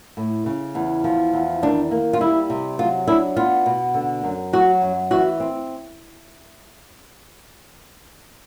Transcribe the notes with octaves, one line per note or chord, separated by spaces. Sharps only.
A2
C#3
E2
F3
E2
D#3 D4
A#3
F4
G3 E4
C3
F#3 F4
D4 E4
B3 F4
B2
D3
F#2
F#3 F#4
F#2
E3 F#4
C4